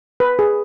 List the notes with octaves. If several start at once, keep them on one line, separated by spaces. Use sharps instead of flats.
B4
G#4